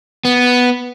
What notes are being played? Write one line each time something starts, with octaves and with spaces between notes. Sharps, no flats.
B3